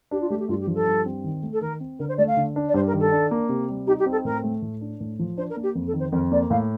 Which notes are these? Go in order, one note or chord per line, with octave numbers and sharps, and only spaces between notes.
D4 G4
F4
A3 G4
G4
G2 F4
G4
F3
A4
G2
C4
D#3
A3
A4
D#3 A#4
C4
D3 A#4
C5
A3 D5
F5
D3
D4
D5
G2 C5
A#4
D#3
A4
D4
A#3
C3
G3
D#4 G4
G4
C4
A4
A2 A#4
A3
A2
D4
A2
F3
D4 C5
A#4
A#3
G4
F2
A4
D#3
C5
F2 A#4
A#3 D5
A2 F5